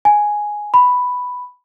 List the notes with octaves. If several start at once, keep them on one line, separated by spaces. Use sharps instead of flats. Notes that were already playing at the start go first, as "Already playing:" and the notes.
G#5
B5